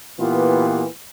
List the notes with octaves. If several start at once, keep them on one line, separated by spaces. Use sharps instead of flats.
A#2 E3 B3 F4 G4